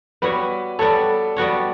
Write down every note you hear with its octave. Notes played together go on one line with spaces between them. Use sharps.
G3 B3 F#4 B4 C#5
G3 B3 F#4 A4 C#5
G3 B3 F#4 C#5